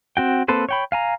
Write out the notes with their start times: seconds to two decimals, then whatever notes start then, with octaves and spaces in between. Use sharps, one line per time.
0.17 C4 F#4 G5
0.48 A#3 C4 A4 B4 C5
0.69 C#5 G5 B5
0.92 F5 G#5 A#5